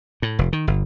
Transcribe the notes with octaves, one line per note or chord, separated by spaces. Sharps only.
A2
F1
D#3
G1